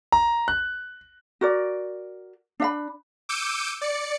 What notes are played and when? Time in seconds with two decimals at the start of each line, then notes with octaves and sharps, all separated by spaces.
0.12 A#5
0.48 F#6
1.41 F#4 A#4 D5
2.60 D4 E5 B5
3.29 D6 E6 G6 C#7 D#7
3.81 D5 C#7